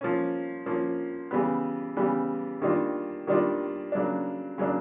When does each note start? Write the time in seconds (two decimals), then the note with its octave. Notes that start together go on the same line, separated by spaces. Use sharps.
0.01 F3 A#3 C#4
0.66 F3 A#3 C#4
1.31 C#3 E3 G3 B3
1.97 C#3 E3 G3 B3
2.62 D#3 G3 A#3 D4 F4
3.27 D#3 G3 A#3 D4 F4
3.92 C#3 F#3 A#3 D4
4.58 C#3 F#3 A#3 D4